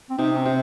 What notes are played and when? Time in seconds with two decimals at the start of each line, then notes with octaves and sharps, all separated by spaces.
0.10 C4
0.18 C3 D#4
0.37 C4
0.45 C3